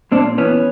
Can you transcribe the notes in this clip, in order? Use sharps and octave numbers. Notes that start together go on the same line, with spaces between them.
A#2 C4 D4
E3 B3 C#4